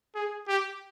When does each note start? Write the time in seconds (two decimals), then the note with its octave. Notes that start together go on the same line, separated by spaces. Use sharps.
0.15 G#4
0.48 G4